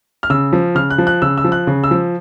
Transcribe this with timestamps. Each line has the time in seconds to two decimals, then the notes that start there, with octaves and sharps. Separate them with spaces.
0.23 F6
0.30 C#3 E6
0.53 F3
0.75 C#3 F6
0.90 F#6
0.98 F3
1.07 F#6
1.22 C#3 E6
1.38 E6
1.44 F3
1.52 F#6
1.67 C#3
1.84 E6
1.91 F3